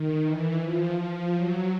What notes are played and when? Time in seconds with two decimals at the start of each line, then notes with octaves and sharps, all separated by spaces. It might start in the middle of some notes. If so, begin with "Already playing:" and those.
Already playing: D#3
0.25 E3
0.62 F3
0.98 F3
1.35 F#3